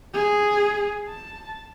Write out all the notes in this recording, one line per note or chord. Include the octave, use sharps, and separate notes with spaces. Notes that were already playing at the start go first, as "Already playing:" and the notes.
G#4
A5